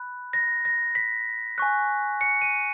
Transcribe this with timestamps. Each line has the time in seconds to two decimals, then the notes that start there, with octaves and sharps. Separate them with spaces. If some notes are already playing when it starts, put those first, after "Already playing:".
Already playing: B5 F#6
0.33 A#6
0.65 A#6
0.95 B6
1.58 G#5 C#6 F#6
2.21 C#7
2.42 D#7